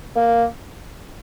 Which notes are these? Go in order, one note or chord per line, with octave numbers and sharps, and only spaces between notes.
A#3